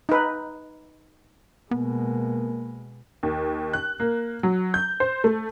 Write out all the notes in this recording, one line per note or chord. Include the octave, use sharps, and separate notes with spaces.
D#4 B4
B2 G#3 A#3 B3
D#2
F#6
A#3
F#3
G6
C5
A3